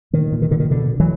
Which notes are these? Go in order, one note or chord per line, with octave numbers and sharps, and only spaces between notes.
A#2 D#3
A#2
D#3
A#2 D3
D#3
B2 D3
B2
E3 F#3